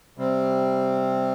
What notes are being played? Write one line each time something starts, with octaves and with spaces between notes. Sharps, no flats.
C3 G3 C4